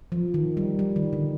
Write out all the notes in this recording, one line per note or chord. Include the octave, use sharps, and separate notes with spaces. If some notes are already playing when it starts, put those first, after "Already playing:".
F3
D#3
G3
G3
D#3
D3